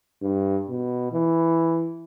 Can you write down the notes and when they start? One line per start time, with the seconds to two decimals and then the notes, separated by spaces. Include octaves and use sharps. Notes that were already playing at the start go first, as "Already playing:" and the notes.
0.22 G2
0.69 B2
1.13 E3